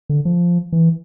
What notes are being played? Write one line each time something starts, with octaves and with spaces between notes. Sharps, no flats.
D3
F3
E3